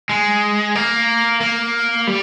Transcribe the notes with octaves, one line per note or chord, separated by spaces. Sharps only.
G#3
A#3
A#3
G3